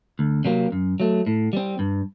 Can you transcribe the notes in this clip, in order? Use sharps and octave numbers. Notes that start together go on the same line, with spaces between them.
D2
C3 F#3 A#3
F#2
F#3 A3
A2
G3 C4
G2